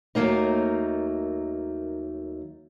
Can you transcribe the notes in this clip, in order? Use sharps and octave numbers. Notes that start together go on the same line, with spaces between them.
D#2 F#3 A3 A#3 D#4